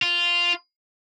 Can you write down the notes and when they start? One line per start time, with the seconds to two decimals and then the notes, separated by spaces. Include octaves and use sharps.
0.02 F4